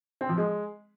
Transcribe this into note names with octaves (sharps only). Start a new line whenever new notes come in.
C4
F3
G#3